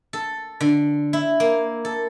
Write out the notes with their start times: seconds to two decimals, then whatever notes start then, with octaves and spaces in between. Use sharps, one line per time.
0.13 A4
0.61 D3
1.13 E4
1.40 A#3
1.85 A4